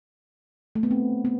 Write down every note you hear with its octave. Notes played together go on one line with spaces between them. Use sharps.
A3
B3
C4
B3